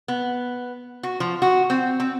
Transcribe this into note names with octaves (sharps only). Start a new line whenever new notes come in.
B3
F#4
F3
F#4
C4
C4